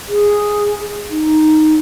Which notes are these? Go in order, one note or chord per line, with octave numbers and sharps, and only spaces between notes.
G#4
D#4